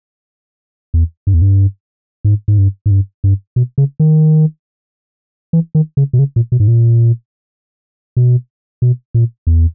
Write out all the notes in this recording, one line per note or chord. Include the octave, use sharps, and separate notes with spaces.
E2
G2
E2
G2
G#2
G#2
G2
G#2
G2
G2
B2
C#3
D#3
E3
D#3
C#3
B2
C#3
A#2
B2
G#2
A#2
B2
B2
A#2
E2